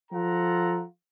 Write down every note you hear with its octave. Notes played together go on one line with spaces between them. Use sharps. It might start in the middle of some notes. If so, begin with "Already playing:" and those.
F3 F4 A4 F#5 A#5